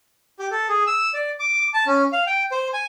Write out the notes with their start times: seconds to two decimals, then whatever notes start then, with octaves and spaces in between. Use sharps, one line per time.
0.39 G4
0.51 A4
0.69 G#4
0.87 E6
1.14 D5
1.40 D6
1.74 A5
1.87 C#4
2.13 F5
2.27 G5
2.52 C5
2.73 G#5